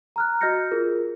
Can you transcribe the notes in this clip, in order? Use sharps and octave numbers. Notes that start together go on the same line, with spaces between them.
A#5 F6 F#6
F#4 D#5 F6 G6 A#6 C#7
F4 G#4 A#4